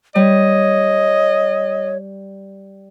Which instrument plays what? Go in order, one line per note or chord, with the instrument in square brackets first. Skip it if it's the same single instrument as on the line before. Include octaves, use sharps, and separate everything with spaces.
[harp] G3 [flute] C#5 [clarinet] D#5